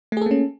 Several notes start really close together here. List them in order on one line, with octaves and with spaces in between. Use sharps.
A3 G#4 A4 A#3 C#4